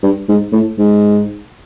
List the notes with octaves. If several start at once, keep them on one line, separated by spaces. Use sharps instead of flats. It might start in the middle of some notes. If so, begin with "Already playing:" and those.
G2
G#2
A2
G#2